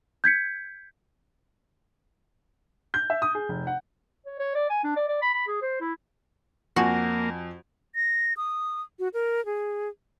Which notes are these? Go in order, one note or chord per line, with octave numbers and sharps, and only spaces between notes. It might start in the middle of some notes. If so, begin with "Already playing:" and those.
G6 G#6 B6 C#7
G6
E5
D#6
G#4
F1
F#5
C#5
C#5
D5
G#5
D4
D5
D5
B5
B5
G#4
C5
E4
F2 A#3 F#4 G#5
A#6
D#6
F#4
A#4
G#4